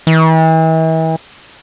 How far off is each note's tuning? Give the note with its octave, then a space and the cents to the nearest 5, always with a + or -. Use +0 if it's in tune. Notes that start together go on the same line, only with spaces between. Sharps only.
E3 -40